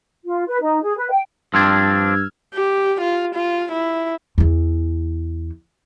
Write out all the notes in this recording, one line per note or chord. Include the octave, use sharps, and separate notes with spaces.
F4
B4
D#4
G#4
B4
G5
G2 F3 C4 D4 E6 F6 G#6
G4
F4
F4
E4
E2 E3